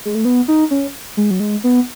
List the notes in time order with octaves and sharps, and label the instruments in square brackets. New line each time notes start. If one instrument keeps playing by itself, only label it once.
[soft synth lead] G#3
A3
B3
D#4
C#4
G#3
F#3
G#3
B3